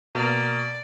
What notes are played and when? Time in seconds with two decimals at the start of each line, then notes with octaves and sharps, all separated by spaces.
0.15 B2 A#3 D5